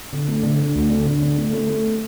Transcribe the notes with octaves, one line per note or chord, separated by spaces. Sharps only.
D3
A3
D3
D3
D2
D3
D3
D3
A3
A3
A3